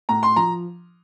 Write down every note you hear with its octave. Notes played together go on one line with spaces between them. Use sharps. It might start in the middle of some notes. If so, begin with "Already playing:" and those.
A2 A#5
C6
F3 A#5